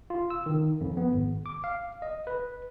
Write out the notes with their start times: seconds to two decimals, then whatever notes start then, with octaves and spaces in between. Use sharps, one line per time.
0.10 F4
0.30 E6
0.46 D#3
0.81 F2
0.97 B3
1.12 G#1
1.46 D6
1.64 F5
2.02 D#5
2.27 B4